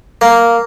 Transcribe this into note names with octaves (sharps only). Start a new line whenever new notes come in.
A#3